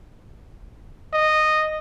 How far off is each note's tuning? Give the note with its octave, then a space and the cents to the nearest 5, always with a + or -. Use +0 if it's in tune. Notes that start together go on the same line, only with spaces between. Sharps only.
D#5 -10